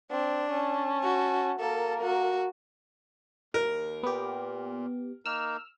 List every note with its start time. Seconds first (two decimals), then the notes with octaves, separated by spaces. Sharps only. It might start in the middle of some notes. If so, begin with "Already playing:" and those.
0.11 C4 D4
0.51 C#4 A5
1.03 F#4
1.60 A#3 A4 A#4
2.02 F#4
3.54 D#2 A#4
4.03 A#2 B3 G4
5.26 A#3 D#4 A#4 E6 F6